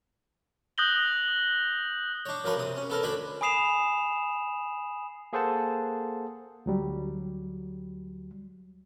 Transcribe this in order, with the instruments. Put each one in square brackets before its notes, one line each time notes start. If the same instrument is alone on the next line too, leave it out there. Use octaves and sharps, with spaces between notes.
[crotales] D#6 F#6 G6 A#6 F#7 G7
[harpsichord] D4 C#5
F#2 F3 A#4 B4 C#5 C6
C3 D#6
C#4
B3 A4 A#4
D2 D4 G5 G#5 B5
[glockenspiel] G#5 B5 D#6 C7 E7 F7
[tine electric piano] A#3 G#4 A4 C5 F#5 A5
[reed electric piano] D2 F#3 G3